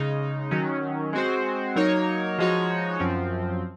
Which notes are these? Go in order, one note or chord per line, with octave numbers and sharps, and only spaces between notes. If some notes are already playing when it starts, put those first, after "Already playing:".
Already playing: C#3 G#3 D#4
D#3 F#3 C#4
G#3 C4 F#4 C5
F#3 A#3 D#4 A#4 C#5
F3 G#3 D#4 F#4 C#5
F#2 F3 C4